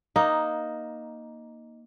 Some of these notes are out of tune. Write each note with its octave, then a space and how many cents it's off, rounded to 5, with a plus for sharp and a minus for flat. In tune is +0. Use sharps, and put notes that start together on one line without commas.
A#3 +10 D#4 +0